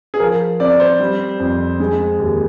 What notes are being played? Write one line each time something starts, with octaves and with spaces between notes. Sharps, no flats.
G#4
F3 A#4
C4 D5
C5
G3
F2
G#3
D#2